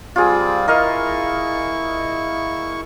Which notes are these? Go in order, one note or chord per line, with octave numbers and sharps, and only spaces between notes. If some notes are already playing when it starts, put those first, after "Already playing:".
G3 C4 F4 G#4 D5
E4 A#4 D#5 F5 C#6